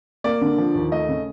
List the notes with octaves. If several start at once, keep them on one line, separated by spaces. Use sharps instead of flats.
A#3 D5
D3
F3
D#2
A3 D#5
C#3